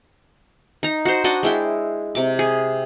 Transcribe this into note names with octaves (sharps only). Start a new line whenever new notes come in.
D#4 A#5
F#4 C5
D4 F#4 D5 D#5
G#3 E4 G5
C3 D6
G#4